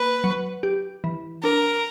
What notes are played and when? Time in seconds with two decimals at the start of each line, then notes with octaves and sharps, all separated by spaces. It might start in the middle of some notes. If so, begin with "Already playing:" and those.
Already playing: A#3 B4
0.24 F#3
0.63 G4
1.04 E3
1.43 D4 A#4